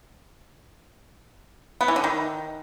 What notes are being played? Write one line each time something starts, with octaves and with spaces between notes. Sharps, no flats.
B3
E3
D3
D#3